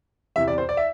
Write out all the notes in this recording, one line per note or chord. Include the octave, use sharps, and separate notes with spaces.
E2 C3 E3 E5
D5
C5
D5
E5